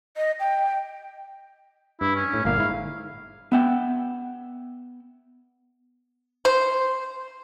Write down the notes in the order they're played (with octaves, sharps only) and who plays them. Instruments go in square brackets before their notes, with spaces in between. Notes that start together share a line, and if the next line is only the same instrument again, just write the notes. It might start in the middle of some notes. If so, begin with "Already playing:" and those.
[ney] D#5
G5
[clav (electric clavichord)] G2 [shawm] E4
[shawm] C#4
[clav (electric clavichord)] A2
[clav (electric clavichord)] G1 A#2 A#3 [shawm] F5
[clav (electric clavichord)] G#2 E4
[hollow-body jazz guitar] B3 E5 G5
[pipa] C5